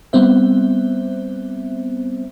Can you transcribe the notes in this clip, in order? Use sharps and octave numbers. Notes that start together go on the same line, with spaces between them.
G3 B3 C4 C5 E5